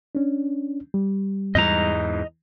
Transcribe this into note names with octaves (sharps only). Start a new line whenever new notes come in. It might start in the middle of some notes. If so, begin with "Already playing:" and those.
C#4 D4
G3
E2 G#2 D#5 A#5